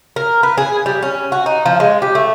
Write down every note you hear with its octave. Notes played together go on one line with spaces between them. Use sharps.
A#4
B4
G#4
G3
C#4
F#4
D#4
F3
G#3
G4
A3